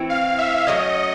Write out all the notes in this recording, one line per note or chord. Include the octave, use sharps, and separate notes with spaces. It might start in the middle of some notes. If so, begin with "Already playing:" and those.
Already playing: E3 A3 C4 E4
F5
E5
F#3 A3 C#4 D#5